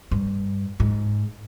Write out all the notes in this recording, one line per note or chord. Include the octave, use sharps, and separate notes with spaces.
G2
G#2